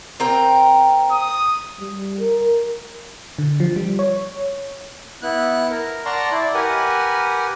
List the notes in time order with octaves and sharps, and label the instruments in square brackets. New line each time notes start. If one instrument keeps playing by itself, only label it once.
[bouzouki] C4 A#4 G5
[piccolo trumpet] D#6
[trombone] G3
A#4
[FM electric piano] D3
F3
G3
C#5
[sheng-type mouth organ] B3 E4 F#6
A#4
D5 F#5 A5 A#5 C6 C#6
E4 D5
G4 A#4 B4 F#5 G#5